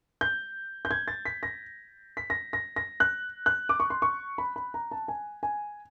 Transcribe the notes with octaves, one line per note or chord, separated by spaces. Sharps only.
G6
G6
G#6
A6
B6
A#6
B6
A#6
A#6
A#6
F#6
F#6
D6
C#6
C6
C#6
B5
B5
A#5
A5
G#5
G#5